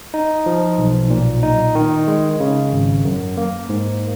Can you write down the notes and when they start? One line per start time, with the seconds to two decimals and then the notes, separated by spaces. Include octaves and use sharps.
0.14 D#4
0.46 F3
0.78 B1
1.10 A#2
1.43 D#4
1.75 D#3
2.08 G#3
2.40 C#3
2.73 G#1
3.05 F#2
3.37 A#3
3.69 G#2